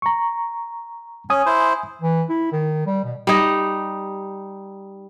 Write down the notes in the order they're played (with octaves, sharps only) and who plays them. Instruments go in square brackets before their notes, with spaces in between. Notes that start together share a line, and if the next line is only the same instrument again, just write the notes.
[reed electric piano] A#5 C#6
[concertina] C#4 [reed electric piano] G#5 D#6
[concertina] E4 C5
[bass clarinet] E3
E4
D#3
G3
B2
[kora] G3 D#4